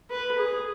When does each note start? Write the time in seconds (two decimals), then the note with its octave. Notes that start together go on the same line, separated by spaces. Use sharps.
0.10 B4
0.38 G#4